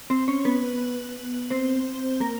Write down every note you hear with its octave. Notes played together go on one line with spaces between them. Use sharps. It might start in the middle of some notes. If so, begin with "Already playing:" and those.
C4 C5
C#4 C#5
B3 B4
C4 C5
A#3 A#4